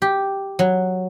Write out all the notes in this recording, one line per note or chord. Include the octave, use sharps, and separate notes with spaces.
G4
F#3